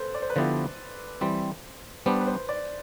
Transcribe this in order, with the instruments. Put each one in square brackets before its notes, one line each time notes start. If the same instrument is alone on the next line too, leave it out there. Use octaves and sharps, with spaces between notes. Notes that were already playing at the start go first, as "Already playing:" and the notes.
Already playing: [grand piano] A4 B4 C5
D5
C5
B4
[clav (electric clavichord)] D3 F3 B3 E4 G4 [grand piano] C5
[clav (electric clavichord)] E3 G3 C4
[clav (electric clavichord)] G3 B3 D4 [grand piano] C5
[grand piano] B4
C5
D5